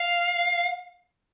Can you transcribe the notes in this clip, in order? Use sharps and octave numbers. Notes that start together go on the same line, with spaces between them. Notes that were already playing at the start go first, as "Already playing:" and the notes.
Already playing: F5